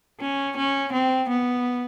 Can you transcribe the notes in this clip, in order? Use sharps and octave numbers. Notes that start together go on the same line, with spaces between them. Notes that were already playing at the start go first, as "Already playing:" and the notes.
C#4
C#4
C4
B3